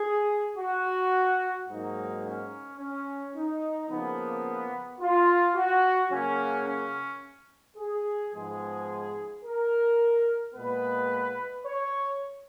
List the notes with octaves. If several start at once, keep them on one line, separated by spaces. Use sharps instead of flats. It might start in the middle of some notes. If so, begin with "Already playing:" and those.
Already playing: G#4
F#4
G#2 F#3 A#3 D#4
C#4
C#4
D#4
C#3 F3 A#3 B3
F4
F#4
C#3 F#3 A#3 C#4
C#4
G#4
G#2 F3 G#3 B3 G#4
A#4
A#2 G#3 B3 B4
C#5